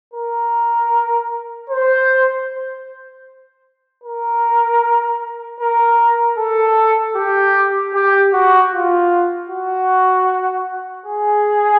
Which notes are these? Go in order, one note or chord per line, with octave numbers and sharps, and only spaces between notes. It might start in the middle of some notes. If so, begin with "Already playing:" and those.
A#4
C5
A#4
A#4
A4
G4
G4
F#4
F4
F#4
G#4